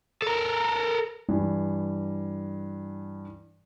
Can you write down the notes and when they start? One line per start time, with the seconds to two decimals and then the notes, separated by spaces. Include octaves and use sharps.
0.22 A4 A#4
1.29 G2 E3